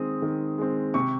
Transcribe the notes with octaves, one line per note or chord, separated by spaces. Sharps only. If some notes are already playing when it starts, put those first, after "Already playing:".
Already playing: D#3 G#3 C4 D#6
D#3
G#3 C4
C3 C#6